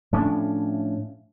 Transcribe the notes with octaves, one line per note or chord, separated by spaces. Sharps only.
A2 F3 C#4 D4